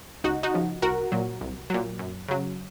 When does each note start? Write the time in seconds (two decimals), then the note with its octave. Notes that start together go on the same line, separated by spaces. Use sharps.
0.24 C#2 D#4 F#4
0.43 D#4 F#4
0.54 C#3 F3
0.82 C2 F#4 A#4
1.12 A#2 F#3
1.41 C2
1.70 A#2 F#3
1.99 F#2
2.28 C#3 F#3